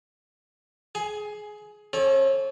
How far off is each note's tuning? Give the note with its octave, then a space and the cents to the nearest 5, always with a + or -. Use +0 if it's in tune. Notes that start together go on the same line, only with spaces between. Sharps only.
G#4 +20 G#5 +15
C#4 -40 A4 -25 C#5 +35